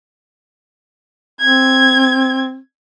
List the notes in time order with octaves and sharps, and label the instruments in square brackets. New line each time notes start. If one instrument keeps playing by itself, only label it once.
[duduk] C4 [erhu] G#6